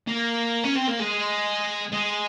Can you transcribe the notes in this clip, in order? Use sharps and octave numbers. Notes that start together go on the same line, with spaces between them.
A#3
C#4
C4
A#3
G#3
G#3